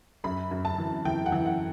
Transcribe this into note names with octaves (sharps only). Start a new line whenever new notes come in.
F#2 B5
F#2
A5
E3
E3 G5
F#5
E3
F#5